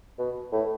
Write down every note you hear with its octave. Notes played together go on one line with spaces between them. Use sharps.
B2
A2